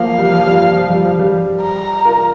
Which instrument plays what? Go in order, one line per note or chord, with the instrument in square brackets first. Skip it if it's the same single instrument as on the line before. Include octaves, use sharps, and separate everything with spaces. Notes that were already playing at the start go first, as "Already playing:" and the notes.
Already playing: [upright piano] F3 A#3 [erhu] F5
[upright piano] G3
F3
G3
F3
F3
G3
F3
G3
[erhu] A#5
[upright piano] F4 A#4